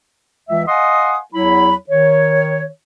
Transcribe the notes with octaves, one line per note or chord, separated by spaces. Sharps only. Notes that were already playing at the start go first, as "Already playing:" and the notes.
C#2 E3 E5
D#5 F5 F#5 G#5 C6 D#6
E2 F#3 E4 C#5 B5
D#3 C#5